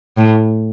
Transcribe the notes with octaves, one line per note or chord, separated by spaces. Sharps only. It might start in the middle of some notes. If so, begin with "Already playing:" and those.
A2